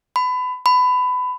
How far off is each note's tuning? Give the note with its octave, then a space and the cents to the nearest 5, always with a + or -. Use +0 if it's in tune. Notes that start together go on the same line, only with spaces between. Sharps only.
B5 +25
B5 +20